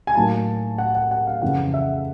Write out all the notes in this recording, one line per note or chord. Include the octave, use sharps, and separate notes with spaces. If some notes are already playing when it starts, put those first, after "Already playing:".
G#5
A2 F#3 A#3 D#4 A5
F#5
F#5
F#5
F5
F2 C#3 E3 F#5
E5